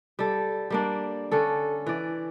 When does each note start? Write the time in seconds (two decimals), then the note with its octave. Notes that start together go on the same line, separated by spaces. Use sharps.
0.19 G3 A4
0.70 G3 A#3 D4
1.31 D3 C#4 A4
1.86 E3 D5